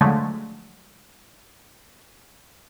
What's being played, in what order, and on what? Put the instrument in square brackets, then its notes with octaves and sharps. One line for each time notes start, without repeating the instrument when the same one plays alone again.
[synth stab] D3 F3 F#3 G#3 A3